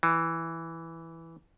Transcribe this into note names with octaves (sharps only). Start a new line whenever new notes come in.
E3